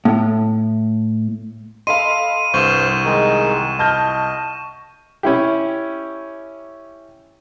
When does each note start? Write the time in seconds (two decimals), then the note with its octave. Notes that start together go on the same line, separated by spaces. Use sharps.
0.05 A2
1.87 A4 D#5 F5 B5 C6 D#7
2.54 C2 G2 C5 C#6 F6 E7
3.05 D#3 G#3 D#4
3.79 D#5 A5 F6 G6
5.23 C#4 E4 G4